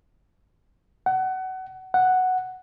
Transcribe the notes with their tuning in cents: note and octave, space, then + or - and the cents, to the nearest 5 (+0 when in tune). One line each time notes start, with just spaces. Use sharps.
F#5 +25
F#5 +0